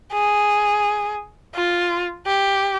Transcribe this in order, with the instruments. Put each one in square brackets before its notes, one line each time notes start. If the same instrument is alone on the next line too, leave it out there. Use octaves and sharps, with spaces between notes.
[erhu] G#4
F4
G4